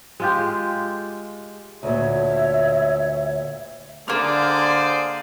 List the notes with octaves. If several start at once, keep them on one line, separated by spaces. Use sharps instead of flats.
G#3 F4 G4
D2 A#2 C#5 E5
D3 A#3 G#4 C5 D5 F6